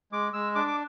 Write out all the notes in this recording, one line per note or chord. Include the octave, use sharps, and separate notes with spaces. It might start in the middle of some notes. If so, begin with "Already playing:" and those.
G#3 D6
G#3 E6
D4 D6
D6